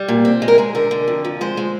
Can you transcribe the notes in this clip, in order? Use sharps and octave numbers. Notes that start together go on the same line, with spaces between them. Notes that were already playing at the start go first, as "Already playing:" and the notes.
Already playing: G3
A#2
C4
G#3
A#4
G#3 G#4
D3 A#4
D3
F2
F3
G#3 C5
G#3